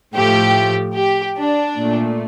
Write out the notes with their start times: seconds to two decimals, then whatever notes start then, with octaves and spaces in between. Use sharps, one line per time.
0.13 A2 F3 A3 G4
0.95 G4
1.37 D4
1.77 A#2 A3